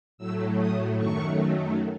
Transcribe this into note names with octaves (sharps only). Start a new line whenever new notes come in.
A2 F#3 A3 E6
D#6
F#2 D#3 F#3 A3 C#6